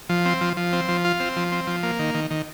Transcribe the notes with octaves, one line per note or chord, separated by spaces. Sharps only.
F3
C4
F3
F3
C4
F3
F4
C4
F3
C4
F3
A#3
D#3
D#3
D#3